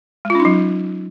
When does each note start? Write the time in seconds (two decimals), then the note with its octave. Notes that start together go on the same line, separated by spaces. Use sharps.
0.25 G#3
0.30 F4
0.35 C#4
0.40 D#4
0.45 F#3